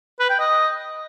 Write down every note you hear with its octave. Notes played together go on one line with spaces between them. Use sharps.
B4
G5
D#5